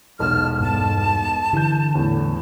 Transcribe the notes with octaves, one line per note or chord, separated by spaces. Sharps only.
E1 B1 A5 F6
G2 B3 A5
D3 E3 G6
E2 A2